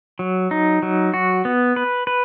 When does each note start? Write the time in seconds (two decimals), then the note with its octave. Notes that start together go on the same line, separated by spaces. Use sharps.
0.19 F#3
0.51 D#4
0.82 F#3
1.14 F#4
1.45 B3
1.76 B4
2.07 B4